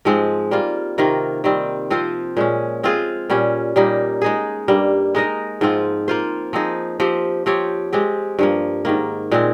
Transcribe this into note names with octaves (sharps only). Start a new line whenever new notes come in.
G#2 F3 G#3 C4
G3 A#3 F4
C3 D#3 A#3 F4
D#3 G3 C4
F3 C4 F4 C5
A#2 G#3 C#4
G#3 C4 F4 G#4
A#2 G3 C#4
A#2 G3 A#3 D#4
G#3 D#4 G#4
G2 G3 A#3
G#3 D#4 A#4 D#5
G#2 F3 C4 F4
A#3 F4 C5
F3 C4 D#4 G#4
F3 C4 G4 C5
F3 C4 G4 C#5
G#3 C4 G4
G2 F3 A#3
G#2 D#3 A#3
A#2 G#3 C4